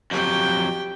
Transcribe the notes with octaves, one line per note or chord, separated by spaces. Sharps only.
F2 F#3 G4 G5